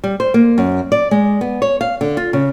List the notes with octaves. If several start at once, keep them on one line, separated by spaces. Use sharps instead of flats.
G3
C5
A#3
F#2
D5
G#3
B3
C#5
F5
D3
F4
C#3